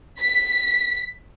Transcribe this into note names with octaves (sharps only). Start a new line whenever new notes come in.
B6